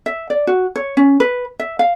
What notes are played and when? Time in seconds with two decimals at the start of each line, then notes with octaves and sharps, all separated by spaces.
0.06 E5
0.30 D5
0.47 F#4
0.76 C#5
0.97 C#4
1.20 B4
1.59 E5
1.79 F5